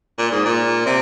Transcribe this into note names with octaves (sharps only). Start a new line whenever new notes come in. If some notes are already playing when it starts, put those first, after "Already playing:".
A#2
G#2
A#2
C3